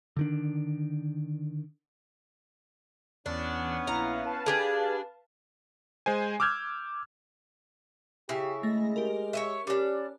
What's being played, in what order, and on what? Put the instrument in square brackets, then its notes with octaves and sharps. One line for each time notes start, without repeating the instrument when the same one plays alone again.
[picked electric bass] D3 D#3 D4
[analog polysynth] E2 [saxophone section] B3 C#4 [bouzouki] D4
[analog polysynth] A#1 E4 [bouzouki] F5 A#5
[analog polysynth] B4 F5 A5
[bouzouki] D4 G4 G#4
[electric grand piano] G#3 C5 G#5
D6 E6 F6 G6 G#6
[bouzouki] C#3 E4 [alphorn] G4
[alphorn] G#3 [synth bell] A3 A#6
[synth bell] G4 A#4
[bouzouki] C#5 D#5 E5
[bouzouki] G3 D4 [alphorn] C#4